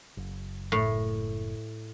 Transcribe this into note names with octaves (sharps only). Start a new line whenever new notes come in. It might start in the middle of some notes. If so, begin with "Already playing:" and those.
F#1
A2